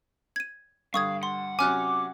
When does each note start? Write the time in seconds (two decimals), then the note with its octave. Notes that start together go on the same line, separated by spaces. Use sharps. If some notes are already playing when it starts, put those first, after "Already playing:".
0.36 G#6 D#7
0.94 G2 D3 F5 C#6 D#6 G#6
1.23 F#5 C6
1.59 C3 F#3 C#4 G#5 D6 F6 F#6